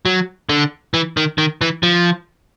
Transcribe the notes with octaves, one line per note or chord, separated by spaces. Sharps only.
F#3
D3
E3
D#3
D#3
E3
F3